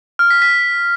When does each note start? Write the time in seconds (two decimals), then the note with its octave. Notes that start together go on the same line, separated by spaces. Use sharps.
0.19 F6
0.31 B6
0.42 B6